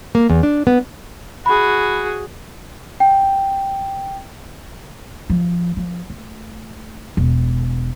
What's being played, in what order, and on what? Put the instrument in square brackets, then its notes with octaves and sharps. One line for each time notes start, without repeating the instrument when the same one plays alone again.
[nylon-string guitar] A#3
E2
D4
B3
[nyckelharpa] F#4 G#4 [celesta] B5
[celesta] G5
[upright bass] F3
F3
A3
E1